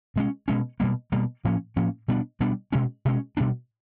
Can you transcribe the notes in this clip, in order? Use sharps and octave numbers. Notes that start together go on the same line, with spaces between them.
B2 G#3 C#4
B2 G#3 C#4
B2 G3 A#3
B2 G3 A#3
A2 F3 A#3 C#4
A2 F3 A#3 C#4
B2 G3 B3 D4
B2 G3 B3 D4
B2 G#3 C#4
B2 G#3 C#4
B2 G3 B3 D4